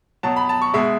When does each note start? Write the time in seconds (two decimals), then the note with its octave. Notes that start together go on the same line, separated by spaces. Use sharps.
0.23 B2 F#3 A5
0.36 B5
0.49 A5
0.62 C#6
0.74 B2 G#3 E5